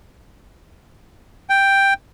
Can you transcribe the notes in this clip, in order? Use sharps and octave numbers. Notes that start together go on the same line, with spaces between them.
G5